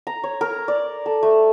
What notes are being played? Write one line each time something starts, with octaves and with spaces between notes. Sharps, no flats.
A#5
C#5
A#4
D5
A4
A3